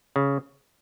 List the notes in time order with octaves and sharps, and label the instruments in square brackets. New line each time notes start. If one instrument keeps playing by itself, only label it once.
[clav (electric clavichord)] C#3